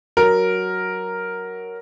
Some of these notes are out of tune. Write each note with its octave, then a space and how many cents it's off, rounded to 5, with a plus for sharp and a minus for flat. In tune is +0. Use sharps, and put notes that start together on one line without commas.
F#3 +5 A#4 +0